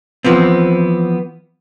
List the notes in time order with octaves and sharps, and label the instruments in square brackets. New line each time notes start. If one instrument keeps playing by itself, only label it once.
[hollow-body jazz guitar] E3 F3 B3 C4